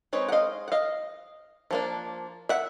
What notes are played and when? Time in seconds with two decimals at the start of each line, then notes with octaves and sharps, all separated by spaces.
0.13 G#3 C4 D#4 B4 C#5
0.29 F#5
0.32 D#5 F5
0.68 F#5
0.72 D#5 F5
1.71 F3 A#3 D4
2.49 E5 F#5